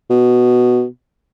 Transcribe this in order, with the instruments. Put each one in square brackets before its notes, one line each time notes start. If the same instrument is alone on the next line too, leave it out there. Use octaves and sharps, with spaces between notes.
[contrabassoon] B2